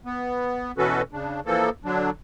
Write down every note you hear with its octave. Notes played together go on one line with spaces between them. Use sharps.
B3
B2 E3 C#4 F#4 A4 B4
C#3 D4
E3 F3 A#3 A4
D3 F#3 D4